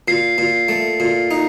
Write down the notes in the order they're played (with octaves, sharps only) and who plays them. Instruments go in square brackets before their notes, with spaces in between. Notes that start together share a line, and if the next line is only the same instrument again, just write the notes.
[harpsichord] A#2 [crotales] C7
[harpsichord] A#2
A3
A#2
D#4